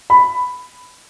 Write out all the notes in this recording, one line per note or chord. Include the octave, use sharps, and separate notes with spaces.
B5